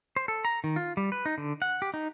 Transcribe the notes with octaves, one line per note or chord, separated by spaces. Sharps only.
C5
A4
A#5
D#3
F4
G3
B4
D#4
D3
F#5
G4
D#4